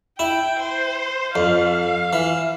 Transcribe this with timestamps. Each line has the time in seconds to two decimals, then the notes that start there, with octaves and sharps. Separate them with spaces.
0.19 E4 G5
0.60 C5
1.35 F2 F5
2.13 E3